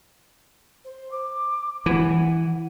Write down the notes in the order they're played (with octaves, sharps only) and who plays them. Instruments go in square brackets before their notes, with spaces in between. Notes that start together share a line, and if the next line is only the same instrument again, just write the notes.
[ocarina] C5
D6
[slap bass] E3 [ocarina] F#5